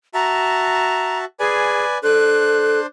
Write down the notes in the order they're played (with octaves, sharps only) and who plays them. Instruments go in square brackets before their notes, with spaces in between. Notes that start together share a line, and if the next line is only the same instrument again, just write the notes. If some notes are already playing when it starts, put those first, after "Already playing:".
[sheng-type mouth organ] F#4 E5 A5 [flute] A#5
[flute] G#4 [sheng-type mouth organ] B4 D5 G#5
[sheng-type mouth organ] D4 C5 [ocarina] A4 [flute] F#6